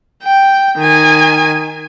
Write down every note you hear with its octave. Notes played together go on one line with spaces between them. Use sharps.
G5
D#3 G#5